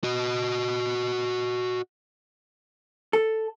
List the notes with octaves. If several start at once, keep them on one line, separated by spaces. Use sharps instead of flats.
F#4 D#5
A4